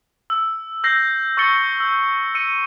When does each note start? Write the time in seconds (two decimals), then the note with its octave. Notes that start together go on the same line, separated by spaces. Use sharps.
0.30 E6
0.84 E6 G6 A#6 C7
1.37 C#6 E6 A6 C#7 G7
1.80 E6 G6
2.35 E6 C#7 D#7